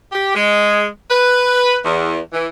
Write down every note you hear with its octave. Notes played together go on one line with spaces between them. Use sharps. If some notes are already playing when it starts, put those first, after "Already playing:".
G4
G#3
B4
E2
E3